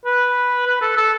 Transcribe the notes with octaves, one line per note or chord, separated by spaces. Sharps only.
B4
B4
A4
A4